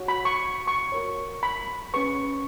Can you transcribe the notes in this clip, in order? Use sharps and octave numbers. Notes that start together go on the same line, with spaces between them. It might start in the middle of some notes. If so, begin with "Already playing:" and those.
Already playing: F#4 C#5
B5
C#6
C#6
F#4 A#4 C#5
B5
C#4 G#4 B4 C#6